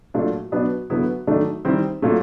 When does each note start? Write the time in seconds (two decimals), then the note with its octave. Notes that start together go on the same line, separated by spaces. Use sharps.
0.14 A#2 F#3 A3 D4
0.51 B2 F#3 B3 D4
0.90 D3 F#3 B3 E4
1.27 D#3 F#3 A3 D4
1.65 D#3 G3 C4 E4
2.02 A#2 F#3 A3